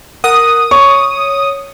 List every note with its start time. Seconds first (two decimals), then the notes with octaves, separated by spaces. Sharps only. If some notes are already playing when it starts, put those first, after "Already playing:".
0.24 A#4 F#5 D#6
0.71 C#5 C#6